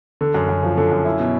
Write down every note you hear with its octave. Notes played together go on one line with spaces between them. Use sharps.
D3
F#2
F#2
F3
D3
F#2
E4
B2